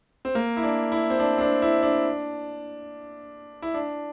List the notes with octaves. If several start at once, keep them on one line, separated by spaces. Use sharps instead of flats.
C4
A#3
E4
D4
E4
C4
D4
C4
D4
E4
D4
E4
D4